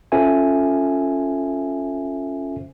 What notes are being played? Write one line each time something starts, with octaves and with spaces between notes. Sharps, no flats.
C#4 F4 A4 C5 E5 G#5